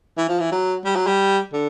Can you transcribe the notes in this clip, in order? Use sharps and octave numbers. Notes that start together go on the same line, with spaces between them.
E3
F3
E3
F#3
G3
F#3
G3
D3